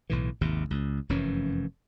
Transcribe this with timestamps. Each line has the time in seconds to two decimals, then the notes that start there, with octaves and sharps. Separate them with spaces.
0.10 B1 A2 E3
0.41 G#1 D#2 C3
0.70 C#2
1.09 F1 F#2 E3 C#4